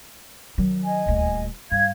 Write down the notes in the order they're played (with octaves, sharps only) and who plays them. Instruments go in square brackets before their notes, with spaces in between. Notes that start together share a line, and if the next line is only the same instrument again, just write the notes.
[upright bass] D#3 F#3
[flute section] D#5 G#5
[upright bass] D#1 D2
[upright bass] G2 [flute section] F5 G#6